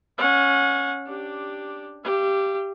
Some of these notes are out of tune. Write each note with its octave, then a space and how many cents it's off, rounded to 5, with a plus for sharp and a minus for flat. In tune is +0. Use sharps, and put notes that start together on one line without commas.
C#4 +0 F#5 -30
D4 +0 G4 +0
G4 +0 F5 -40